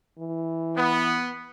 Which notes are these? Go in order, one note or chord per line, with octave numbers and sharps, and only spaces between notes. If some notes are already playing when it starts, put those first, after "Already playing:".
E3
B3